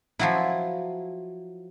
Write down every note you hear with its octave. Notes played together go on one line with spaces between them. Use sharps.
F3 F#3 E4